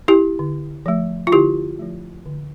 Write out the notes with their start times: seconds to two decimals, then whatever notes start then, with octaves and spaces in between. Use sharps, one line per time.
0.08 E4 G4
0.39 D3
0.86 F3 A3
1.27 F4
1.32 D3 E4 G4
1.79 F3 A3
2.26 D3